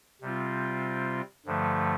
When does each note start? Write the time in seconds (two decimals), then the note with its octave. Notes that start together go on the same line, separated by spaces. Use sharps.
0.22 C3 G3 C4 F4
1.46 G2 D3 F3 A3